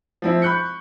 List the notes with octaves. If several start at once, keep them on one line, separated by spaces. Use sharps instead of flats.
F3 C4 E4
B5 C#6 F#6 G6 C#7